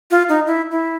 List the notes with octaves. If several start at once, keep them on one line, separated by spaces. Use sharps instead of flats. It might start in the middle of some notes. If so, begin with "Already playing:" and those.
F4
D#4
E4
E4